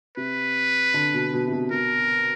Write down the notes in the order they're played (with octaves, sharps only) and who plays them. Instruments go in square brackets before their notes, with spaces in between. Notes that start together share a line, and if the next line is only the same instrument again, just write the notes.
[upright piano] C3 [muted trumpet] B4
[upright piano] D3
B2
B2
C3
B2
[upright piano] B2 [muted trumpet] A#4